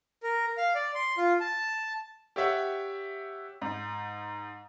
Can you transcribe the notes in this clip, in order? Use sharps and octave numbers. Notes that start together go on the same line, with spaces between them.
A#4
F5
D5
C6
F4
A5
G4 C#5 E5 F#5
G#2